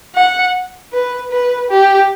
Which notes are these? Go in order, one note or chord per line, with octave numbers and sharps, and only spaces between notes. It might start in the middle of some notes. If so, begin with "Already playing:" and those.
F#5
B4
B4
G4